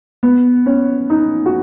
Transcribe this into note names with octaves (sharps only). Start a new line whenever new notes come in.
B3
C#4
D#4
F#4